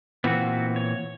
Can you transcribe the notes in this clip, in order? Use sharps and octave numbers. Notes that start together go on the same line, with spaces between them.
A#2 E3 B3 C4 F#4
C#5